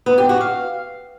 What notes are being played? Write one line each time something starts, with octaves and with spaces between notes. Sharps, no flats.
B3
G4
F#4
F5